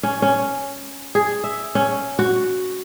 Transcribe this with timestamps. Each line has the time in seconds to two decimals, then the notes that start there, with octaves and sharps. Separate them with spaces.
0.03 C#4
0.22 C#4
1.15 G#4
1.44 E5
1.75 C#4
2.19 F#4